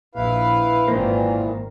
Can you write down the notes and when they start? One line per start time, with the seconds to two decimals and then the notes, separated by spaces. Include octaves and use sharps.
0.15 A#1 E4 B4 F5
0.88 G#1 A#2 D#3 E3 A#3 A#4 C5